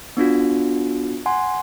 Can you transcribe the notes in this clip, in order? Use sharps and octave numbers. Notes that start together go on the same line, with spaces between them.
B3 D4 F4 F#4
F#5 G#5 C6